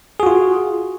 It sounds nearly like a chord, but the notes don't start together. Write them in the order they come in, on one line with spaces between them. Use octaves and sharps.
G#4 F#4 F4